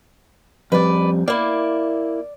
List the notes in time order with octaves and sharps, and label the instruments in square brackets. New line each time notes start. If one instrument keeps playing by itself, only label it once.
[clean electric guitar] F2 G3 [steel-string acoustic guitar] B4 D5
[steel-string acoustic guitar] A#3 E4 [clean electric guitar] D5